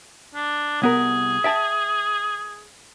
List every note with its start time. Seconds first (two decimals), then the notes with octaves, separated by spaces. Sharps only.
0.35 D4
0.82 C2 B3 G#4 A#4
1.44 E5 G5 A5